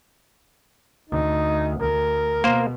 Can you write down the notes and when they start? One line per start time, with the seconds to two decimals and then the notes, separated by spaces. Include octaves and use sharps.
1.09 D2 D#4
1.79 D2 A#4
2.44 B2 A#3 C5